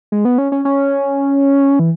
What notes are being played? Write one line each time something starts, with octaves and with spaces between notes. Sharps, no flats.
G#3
B3
C#4
C#4
C#4
E3